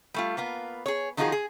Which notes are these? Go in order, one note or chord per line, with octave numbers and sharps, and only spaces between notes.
G3 A3 F4
A#3 B3 F4
G#4 C#5
D#3 F3 D#4 F4 F#4 G#4
G#4